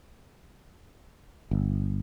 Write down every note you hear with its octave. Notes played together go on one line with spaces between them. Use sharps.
G1